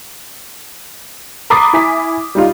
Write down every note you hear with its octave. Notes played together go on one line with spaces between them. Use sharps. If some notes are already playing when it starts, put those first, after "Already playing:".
A#5 B5 D6 D#6 A6 C7
E4 G#5 B6
G3 D#4 F4